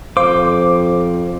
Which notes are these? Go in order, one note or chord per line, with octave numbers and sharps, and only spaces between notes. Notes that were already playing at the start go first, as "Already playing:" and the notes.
F2 C5 F5 D6